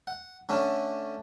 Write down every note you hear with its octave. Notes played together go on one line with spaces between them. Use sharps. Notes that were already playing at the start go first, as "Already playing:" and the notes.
F#5
D3 A3 C#4 D4